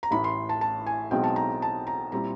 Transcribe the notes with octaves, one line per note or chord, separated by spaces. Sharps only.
A#5
A1 A2 E3 B5
C6
A5
A5
G#5
B1 B2 G#3 C4 D#4 G5
A5
A#5
A5
A#5
A#2 G3 C4 E4 A#5